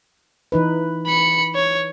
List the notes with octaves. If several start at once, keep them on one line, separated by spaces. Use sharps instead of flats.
E3 D#4 B4
B5 C#7
C#5